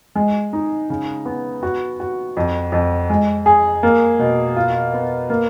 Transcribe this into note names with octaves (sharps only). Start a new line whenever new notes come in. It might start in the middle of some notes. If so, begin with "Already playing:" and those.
G#3
D#4
C#3
B3
F#4
F#4
F2
F2
G#3
G#4
A#3
B2
F4
B3
A#3